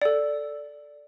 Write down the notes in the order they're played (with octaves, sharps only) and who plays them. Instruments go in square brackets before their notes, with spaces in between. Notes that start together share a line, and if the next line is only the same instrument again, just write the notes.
[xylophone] A4 D5